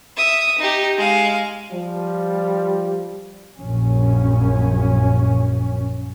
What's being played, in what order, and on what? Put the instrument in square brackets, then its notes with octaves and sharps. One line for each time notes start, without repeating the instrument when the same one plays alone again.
[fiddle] E5 D#6
D#4 G4
G#3 F5
[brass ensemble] F3 [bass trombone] G3
[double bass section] A#1 F#2 F3 C#4